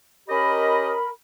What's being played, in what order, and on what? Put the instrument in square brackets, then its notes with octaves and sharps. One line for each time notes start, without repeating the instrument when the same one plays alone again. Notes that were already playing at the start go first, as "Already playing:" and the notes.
[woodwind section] C#4 G4 D#5 [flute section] A#4 B5